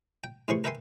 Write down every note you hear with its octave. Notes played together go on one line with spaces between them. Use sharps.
G5
A2 C3 E3 G#4 C6 C#6
A#4 B4 E5 G5 G#5 C6